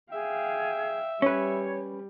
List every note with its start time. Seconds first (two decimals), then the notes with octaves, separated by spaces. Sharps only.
0.12 G#4 E5 F5 G5
1.22 G3 C#4 B4 C#5